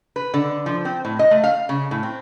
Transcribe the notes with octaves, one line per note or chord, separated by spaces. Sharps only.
B4
D3
F3
C4
A2
D#5
A3
F5
C#3
A2
C4